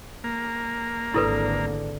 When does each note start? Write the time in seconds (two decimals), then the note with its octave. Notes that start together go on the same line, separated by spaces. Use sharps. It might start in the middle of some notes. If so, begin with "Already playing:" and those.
0.24 A#3
1.14 G#1 D3 E4 A4 B4